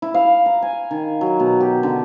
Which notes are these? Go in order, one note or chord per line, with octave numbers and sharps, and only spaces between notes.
E4
F5
A#5
G#5
D#3
F#3
B2
G4
D3